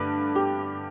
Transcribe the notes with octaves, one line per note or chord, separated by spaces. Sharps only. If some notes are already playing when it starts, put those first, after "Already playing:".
Already playing: G2 D3 A3 B4
G4